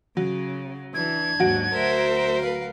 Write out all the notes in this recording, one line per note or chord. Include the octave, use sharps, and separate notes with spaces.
C#3 F#3
E3 D4 G#6
D#2 G#2 F#3 F#4 D7
D2 A#4 C5 E5
B4 F5